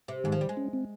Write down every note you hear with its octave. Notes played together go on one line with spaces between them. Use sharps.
C3
G#2 D#3
F3
G3
G#3
C#4
C4